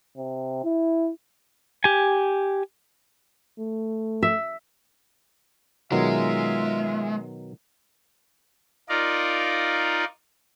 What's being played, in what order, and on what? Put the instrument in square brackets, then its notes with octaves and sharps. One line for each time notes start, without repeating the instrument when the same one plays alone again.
[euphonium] C3
E4
[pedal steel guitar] G4 G#5
[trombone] A3
[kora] E5
[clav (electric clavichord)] B2 D#3 F#3 [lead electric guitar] G#3 [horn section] F4 E5
[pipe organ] D#4 F4 A#4 D5